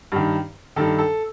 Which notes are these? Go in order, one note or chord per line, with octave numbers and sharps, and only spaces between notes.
G2 D#3
G2 D#3 A4
A4